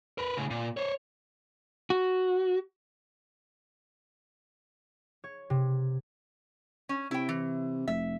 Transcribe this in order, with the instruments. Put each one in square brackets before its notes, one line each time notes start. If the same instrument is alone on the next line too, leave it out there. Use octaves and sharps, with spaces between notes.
[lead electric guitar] A#4 B4
A2 C#3
A#2
C5 C#5
[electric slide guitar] F#4
[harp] C#5
C3
[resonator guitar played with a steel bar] C#4
[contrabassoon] C3 [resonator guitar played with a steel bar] E4 G5
[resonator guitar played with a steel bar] E3
[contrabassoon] F1 [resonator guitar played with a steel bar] E5